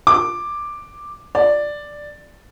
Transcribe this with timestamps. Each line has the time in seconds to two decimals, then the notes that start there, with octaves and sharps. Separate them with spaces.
0.07 D6
1.35 D5